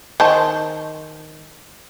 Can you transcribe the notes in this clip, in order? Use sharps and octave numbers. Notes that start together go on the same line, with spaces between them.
D#3 C5 A5